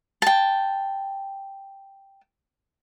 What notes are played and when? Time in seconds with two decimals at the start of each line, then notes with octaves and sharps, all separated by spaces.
0.22 G5 A5